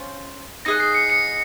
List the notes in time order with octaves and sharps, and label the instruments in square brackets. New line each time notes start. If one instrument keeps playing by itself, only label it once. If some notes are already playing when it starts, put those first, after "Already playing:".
Already playing: [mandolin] C#4 F4 C5
[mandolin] D#4 G#4 D#5 F#5 [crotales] A#6
[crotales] C7
C#7
C#7